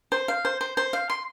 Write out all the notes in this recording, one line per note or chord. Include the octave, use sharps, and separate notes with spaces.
C5
F5
C5
C5
C5
F5
C6